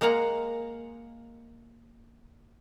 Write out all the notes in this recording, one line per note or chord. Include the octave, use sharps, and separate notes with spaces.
G#3 A#3 F5 F#5 A#5